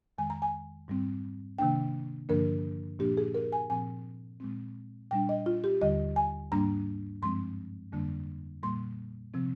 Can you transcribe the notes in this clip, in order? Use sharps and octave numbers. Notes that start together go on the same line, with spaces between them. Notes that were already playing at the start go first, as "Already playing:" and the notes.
F2 D#3 G#3 G#5
A#5
G#5
G#2 G3 C4
C3 D#3 A#3 D4 G5
G2 D3 F3 A#3 D4 A#4
A#2 F3 A#3 D4 G4
G#4
A#4
G#5
A#2 F3 C4 G#5
A#2 G#3 C4
A#2 G3 D4 G5
D#5
F4
G4
D#2 D3 G3 D#5
G#5
G#2 G3 A#3 D4 A#5
G2 F3 G#3 C4 C6
F2 D3 G3 A#3 D4
A#2 G3 A#3 C6
C3 F3 C4